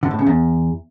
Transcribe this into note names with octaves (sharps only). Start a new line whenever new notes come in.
D3
A2
C#3
E2